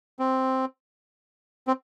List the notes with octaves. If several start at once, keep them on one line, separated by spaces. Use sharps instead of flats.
C4
C4